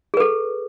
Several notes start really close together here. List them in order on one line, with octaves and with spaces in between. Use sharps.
G#4 B4 A4